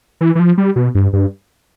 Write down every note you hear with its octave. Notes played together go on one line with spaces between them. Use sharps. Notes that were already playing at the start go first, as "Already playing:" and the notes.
E3
E3
F3
G3
B2
G2
G2